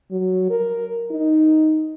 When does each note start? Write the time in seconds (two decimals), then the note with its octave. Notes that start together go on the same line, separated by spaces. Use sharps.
0.11 F#3
0.50 A#4
1.11 D#4